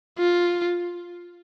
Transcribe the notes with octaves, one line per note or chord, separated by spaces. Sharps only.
F4